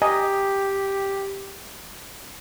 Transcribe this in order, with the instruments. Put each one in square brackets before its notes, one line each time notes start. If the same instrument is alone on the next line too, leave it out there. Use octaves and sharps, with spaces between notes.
[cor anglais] G4 [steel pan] D#5 G#5 A#5